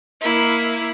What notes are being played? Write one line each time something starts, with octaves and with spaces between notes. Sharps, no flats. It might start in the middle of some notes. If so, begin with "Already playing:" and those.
A#3 E4